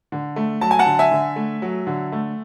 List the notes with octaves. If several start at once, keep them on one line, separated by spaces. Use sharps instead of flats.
D3
A3
F#3 A5
G#5
F#5 A5
D3
E5 G#5
D3
A3
F#3
D3
A3